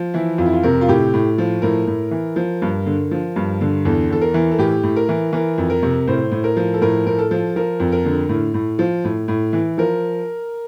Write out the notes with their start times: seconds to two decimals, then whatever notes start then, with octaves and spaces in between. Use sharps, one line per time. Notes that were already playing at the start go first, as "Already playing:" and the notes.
Already playing: F3
0.14 E3 E4
0.38 F2 F4
0.46 E4
0.53 F4
0.63 C3 A#4
0.81 F4
0.88 A2 G4
1.14 A2
1.38 F3
1.62 A2 A#4
1.87 A2
2.11 E3
2.36 F3
2.62 G2
2.86 D3
3.11 F3
3.36 G2
3.61 D3
3.85 E2 A4
4.10 E2 A4
4.21 A#4
4.34 E3
4.51 A4
4.58 A2 G4
4.83 A2
4.96 A#4
5.09 E3
5.33 E3 A#4
5.58 F2
5.70 A#4
5.83 C3
6.07 A2 C5
6.32 A2
6.44 A#4
6.57 F3
6.74 A4
6.81 A2 A#4
7.06 A2 A#4
7.19 A4
7.31 F3
7.56 F3 A#4
7.80 F2
7.92 A#4
8.05 D3
8.29 A2
8.54 A2
8.79 F3
9.05 A2
9.28 A2
9.53 E3
9.78 F3 A#4